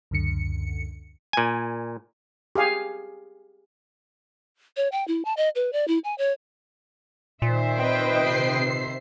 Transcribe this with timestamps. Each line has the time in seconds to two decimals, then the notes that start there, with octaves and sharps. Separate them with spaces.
0.11 C#2 F#2 D3 C#7
1.33 A#2 G#5
2.56 G4 G#4 F5 G#5
4.77 C#5
4.92 G5
5.08 E4
5.25 A5
5.37 D#5
5.55 B4
5.73 D5
5.88 E4
6.04 G#5
6.18 C#5
7.42 A#2 D#3 C5 E5
7.77 C4 B4 D#5 G5
8.23 C3 C7